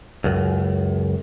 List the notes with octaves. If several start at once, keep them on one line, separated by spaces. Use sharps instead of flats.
C#2 F#2